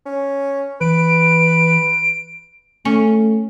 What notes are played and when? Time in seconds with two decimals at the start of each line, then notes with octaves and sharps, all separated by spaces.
0.06 C#4
0.81 E3 B4 D7
2.85 A3 C#4